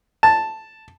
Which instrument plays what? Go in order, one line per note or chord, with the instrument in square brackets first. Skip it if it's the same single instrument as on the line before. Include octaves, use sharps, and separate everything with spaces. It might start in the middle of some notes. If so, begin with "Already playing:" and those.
[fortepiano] A5